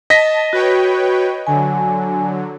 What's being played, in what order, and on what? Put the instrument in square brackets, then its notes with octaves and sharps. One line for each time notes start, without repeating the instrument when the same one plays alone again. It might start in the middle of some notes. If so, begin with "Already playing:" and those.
[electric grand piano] D#5 A#6 B6 [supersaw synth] A5
[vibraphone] F#4 [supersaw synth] B4 C#5 G5
[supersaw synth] D3 F#3 [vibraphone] G#5